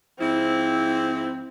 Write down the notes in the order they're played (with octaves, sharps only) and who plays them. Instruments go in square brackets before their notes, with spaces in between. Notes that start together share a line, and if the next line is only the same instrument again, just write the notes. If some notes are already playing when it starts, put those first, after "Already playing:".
[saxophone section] G#2 F3 E4 [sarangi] C4